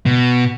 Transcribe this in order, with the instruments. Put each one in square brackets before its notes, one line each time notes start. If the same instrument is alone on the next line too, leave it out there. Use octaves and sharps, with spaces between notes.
[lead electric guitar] B2